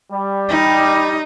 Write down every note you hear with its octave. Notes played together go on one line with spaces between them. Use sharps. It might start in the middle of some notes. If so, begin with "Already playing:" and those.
G3
D#4